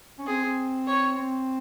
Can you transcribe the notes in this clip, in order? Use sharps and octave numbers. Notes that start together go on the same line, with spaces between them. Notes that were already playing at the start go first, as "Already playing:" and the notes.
C#4
C4 G#4
C4
C#5
C4